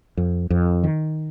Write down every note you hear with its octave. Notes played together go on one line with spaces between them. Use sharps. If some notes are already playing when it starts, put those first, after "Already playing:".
F2
F2
D#3